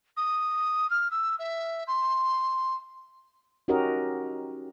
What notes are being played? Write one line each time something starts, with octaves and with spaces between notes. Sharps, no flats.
D#6
F6
E6
E5
C6
C#4 D#4 F#4 G4 A#4 D#5